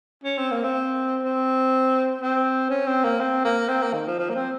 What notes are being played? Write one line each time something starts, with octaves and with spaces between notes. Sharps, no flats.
C#4
C4
A#3
C4
C4
C4
C#4
C4
A#3
C4
A#3
C4
A#3
D#3
F3
F3
A#3
C4